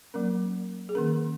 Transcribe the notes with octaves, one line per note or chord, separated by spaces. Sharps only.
F#3 A#3 C#4 A#4
G#4
D#3 A#3 C#4 A#4